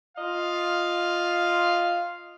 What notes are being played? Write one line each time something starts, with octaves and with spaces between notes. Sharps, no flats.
F4 D#5 F5